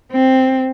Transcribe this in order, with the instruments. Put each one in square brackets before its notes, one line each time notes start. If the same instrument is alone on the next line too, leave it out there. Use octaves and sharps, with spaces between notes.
[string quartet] C4